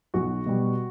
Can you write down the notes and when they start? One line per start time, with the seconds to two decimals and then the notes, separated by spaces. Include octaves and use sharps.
0.14 B1 F#4
0.46 B2 G3